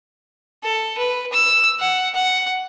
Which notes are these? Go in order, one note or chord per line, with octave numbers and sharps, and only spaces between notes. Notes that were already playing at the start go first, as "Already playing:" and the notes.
A4
B4
E6
F#5
F#5